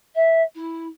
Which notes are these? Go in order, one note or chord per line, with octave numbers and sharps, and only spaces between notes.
E5
E4